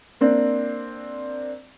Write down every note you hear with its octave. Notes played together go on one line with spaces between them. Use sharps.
A#3 C4 D4